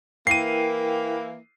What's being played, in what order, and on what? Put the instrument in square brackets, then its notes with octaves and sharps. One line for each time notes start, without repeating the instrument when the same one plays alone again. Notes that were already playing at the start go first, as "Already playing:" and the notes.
[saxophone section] E3 A#3 [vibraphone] E4 A#4 G5 [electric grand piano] C7 D#7